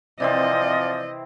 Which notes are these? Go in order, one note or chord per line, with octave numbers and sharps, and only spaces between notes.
C3 E3 F3 C4 D5 D#5